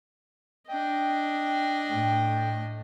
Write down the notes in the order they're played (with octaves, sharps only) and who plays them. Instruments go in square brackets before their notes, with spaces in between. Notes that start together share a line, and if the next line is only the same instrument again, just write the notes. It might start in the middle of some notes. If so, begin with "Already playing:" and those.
[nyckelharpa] D4 D#5 [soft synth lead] G5
[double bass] A2 A3 [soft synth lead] G5